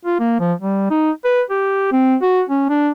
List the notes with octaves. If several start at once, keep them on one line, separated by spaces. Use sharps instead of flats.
F4
A#3
F3
G3
D#4
B4
G4
C4
F#4
C#4
D4